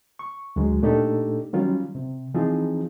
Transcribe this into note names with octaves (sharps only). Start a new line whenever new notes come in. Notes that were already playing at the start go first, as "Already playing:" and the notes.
C#6
D2 F#3 G#3
A#2 A3 D4 D#4 G4 A4
D#3 F#3 G3 C#4 F4
C3
E3 F3 C4 D#4 F4 G#4